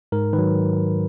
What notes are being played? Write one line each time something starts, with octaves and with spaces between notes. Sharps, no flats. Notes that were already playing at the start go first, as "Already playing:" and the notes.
G#2 A#4
D#3 B4
F#3